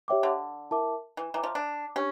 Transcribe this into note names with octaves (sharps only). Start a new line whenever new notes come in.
G4 C#5 E5 G5 D6
D3
E4 A#4 E5 A5 D6
E3
E3 C#5 E5 G5 A#5 D6
F3
D4
C#4 D4 G4